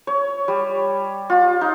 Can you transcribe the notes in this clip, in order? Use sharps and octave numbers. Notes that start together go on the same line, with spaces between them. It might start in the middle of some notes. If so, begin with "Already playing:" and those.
C#5
G3
F4
D#4